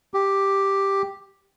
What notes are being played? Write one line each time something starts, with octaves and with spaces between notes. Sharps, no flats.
G4